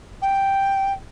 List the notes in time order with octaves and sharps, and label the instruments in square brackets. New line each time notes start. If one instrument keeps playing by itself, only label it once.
[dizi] G5